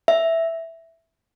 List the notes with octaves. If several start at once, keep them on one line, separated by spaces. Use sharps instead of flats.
E5